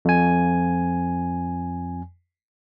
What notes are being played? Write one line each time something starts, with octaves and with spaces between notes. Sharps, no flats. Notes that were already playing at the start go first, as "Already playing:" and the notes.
F2 G#5